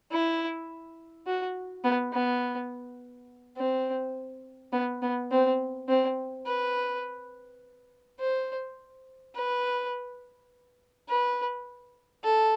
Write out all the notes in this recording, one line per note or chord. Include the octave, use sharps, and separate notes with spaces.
E4
F#4
B3
B3
C4
B3
B3
C4
C4
B4
C5
B4
B4
A4